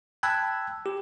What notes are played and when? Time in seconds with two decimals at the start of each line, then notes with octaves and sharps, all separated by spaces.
0.23 G5 A5 B5 E6 F#6 G#6
0.86 G4